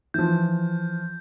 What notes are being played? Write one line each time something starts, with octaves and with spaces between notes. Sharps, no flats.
E3 F3 G6